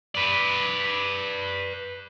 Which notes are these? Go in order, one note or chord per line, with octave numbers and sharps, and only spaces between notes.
B4 D5